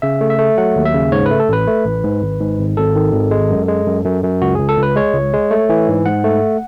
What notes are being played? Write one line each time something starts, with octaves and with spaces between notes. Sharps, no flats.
C#3 E5
A3
E5
A3
F#3 F#5
D#2
E5
C#3
G#2 C#5
B4
A3
A4
A1 B4
A3
A1
G#2
G#1
G#2
G#1
G#1 A4
D#3
G#1
G#3
F#2
G#3
F#2
F#2
F#2
C#2 F#4
C#2 G#4
A4
C#2 B4
G#3 C#5
C#2
G#3
A3
E3
G#2
G#2 F#5
A3